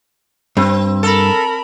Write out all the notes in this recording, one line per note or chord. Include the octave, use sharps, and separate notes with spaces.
G2 C4
A4 A#4 B5